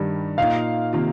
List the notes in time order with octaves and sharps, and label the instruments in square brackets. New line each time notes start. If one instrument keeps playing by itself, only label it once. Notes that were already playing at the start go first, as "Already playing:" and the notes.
Already playing: [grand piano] G2 D#3 G3
[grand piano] A#2 A#3 D#4 [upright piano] F5
[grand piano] C3 D#3 A#3 F4